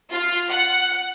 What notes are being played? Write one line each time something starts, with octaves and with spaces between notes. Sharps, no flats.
F4
F#5